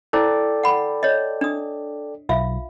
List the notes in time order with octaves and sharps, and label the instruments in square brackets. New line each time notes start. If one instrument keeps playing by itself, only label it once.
[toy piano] E4 C5 [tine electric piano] A4 D5 G5
[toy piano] F#5 B5
C#5 D#5
D4 D#6
[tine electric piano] B1 [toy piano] F4 E5 F5